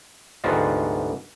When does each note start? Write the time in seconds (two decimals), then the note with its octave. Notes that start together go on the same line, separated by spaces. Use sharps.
0.44 D2 G#2 C3 B3 F4 F#4